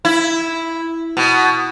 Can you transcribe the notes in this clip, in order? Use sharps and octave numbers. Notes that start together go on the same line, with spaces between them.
E4
B2